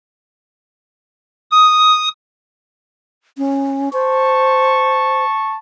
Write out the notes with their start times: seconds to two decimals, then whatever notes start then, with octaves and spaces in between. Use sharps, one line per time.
1.51 D#6
3.38 C#4
3.93 C5 A5 C#6